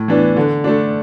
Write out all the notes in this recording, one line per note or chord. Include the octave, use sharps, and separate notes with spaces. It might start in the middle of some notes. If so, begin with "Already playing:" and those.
Already playing: A2
E3 B3 D4
D3
A3 D4